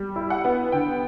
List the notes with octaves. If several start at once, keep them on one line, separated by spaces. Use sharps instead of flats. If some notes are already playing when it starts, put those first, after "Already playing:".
Already playing: G3
E4
F#5
B3
D3 G5